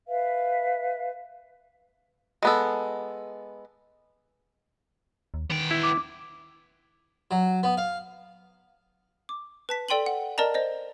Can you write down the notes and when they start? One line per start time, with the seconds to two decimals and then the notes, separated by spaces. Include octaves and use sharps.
0.07 B4 E5 F5
2.43 G#3 B3 A4
5.34 D#2
5.50 D#3 B3 G5
5.71 E4
5.83 D6
7.31 F#3
7.63 B3
7.77 F5
9.29 D6
9.69 B4 A5 B6
9.89 A4 D5 G5 C6 D#7 F#7
10.06 F#5
10.38 A#4 D5 D#5 A5 A#5
10.54 C5 D5 D#5